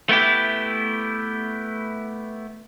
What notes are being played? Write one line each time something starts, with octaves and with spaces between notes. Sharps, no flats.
A3 B3 E4 G4